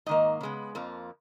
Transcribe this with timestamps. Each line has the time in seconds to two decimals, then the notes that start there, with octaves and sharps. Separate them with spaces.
0.06 G#2 D#3 A#3 D#5
0.41 C#3 G#3 B3
0.75 F2 F3 A#3